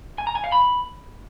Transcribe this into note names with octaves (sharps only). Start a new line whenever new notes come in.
G#5
A#5
G#5
F5
B5